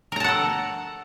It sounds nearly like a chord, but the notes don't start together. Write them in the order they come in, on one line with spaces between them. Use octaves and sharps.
A#4 A#5 A5 F#5 A4